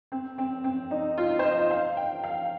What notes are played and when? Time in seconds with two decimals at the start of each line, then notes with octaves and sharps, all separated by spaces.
0.12 C4
0.38 C4
0.64 C4
0.91 D#4
1.18 F4
1.39 C5
1.44 D#5
1.71 F5
1.97 G5
2.24 F5